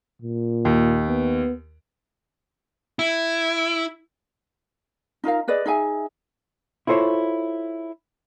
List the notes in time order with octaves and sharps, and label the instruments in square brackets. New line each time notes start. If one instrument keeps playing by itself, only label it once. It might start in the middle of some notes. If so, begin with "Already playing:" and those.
[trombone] A#2
[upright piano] D#2
[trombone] B3
[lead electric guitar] E4
[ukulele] D#4 F4 A#4 F5
G#4 B4 D5 D#5
D#4 G#4 E5 G#5
[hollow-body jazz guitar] E4 F4 A4 C5 C#5